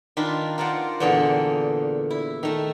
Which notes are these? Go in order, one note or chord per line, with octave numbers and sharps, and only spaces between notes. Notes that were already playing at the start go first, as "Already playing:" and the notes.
D#3 D4 F4 B5 C6
F4 A#4 C5 D5 F#5
E2 A#2 D3 G#4 A4 G5
E4
D#3 A3